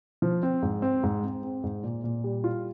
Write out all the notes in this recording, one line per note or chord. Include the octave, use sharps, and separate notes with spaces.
F3
C4
G#2
C4
G#2
C4
C4
G#2
A#2
A#2
G3
F4